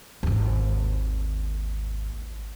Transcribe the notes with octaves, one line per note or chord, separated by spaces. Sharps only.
G#1 D#2